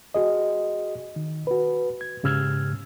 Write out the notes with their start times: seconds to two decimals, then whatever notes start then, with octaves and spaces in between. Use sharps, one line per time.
0.14 F#4 G#4 D#5
1.16 D#3
1.47 F#4 B4
2.01 G#6
2.23 G#2 C#3 G4 E6 F6 G#6